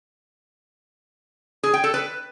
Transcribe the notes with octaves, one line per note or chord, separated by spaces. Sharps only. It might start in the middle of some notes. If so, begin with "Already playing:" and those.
G#4
G5
A4
B4